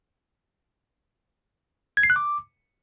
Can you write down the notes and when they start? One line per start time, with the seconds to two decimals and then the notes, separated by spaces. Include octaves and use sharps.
1.97 G#6
2.03 C7
2.10 F#6
2.16 D6